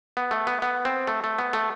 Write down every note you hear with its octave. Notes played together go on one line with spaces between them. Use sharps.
B3
A3
B3
B3
C4
A3
A3
B3
A3